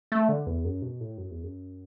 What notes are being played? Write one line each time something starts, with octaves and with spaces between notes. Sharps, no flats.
A3
D3
E2
F#2
B2
A2
F#2
E2
F#2